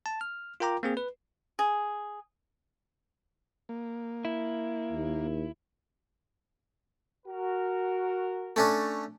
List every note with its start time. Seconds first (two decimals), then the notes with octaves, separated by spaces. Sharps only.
0.06 A5
0.21 F6
0.60 F4 A#4 G5 A#5 D6
0.83 A#3 C4 G#4
0.97 B4
1.59 G#4
3.69 A#3
4.25 E4
4.92 D#2
7.26 F#4 A#4
8.56 A3 C#4 D4